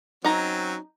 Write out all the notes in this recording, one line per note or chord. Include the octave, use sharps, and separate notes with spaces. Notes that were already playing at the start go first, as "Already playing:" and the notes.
F#3 C4 C#4 D#4 A#5